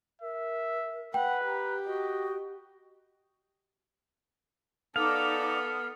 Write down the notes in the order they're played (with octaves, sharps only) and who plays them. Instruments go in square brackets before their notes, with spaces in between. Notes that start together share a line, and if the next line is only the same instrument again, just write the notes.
[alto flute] A#4 [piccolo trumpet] E5
[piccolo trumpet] B4 [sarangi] F#5 [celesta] G5
[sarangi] G4 [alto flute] A#5
[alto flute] F#4 [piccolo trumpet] D#5
[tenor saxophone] B3 [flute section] D#4 D5 D6 [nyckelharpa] A4 [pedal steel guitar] F5